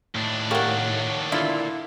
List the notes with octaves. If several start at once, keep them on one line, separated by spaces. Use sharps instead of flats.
D#2 A2 D4
G4 A#4 C#5 F5 F#5
D3 E4 F4 A#4 D5